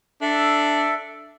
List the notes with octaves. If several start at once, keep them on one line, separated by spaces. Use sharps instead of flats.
D4 A4 E5